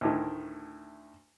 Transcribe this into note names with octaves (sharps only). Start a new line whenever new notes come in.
D2 A2 D#3